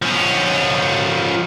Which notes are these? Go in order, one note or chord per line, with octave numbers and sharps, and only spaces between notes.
F3 C#4